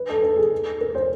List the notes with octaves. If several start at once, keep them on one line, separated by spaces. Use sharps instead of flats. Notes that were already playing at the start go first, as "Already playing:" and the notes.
Already playing: B4
A4
A4
G#4
A#4
C5